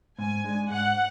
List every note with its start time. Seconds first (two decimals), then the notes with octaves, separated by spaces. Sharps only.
0.19 G#2 G#5
0.44 G#3 D4
0.70 G#2 F#5